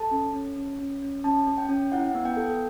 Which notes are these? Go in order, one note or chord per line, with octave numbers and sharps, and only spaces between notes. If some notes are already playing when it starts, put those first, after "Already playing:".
Already playing: A4 A5
C#4
C#4
C#4
C#4
C#4
C#4 A5
C#4
G5
C#4
E4 F#5
B3
G5
A4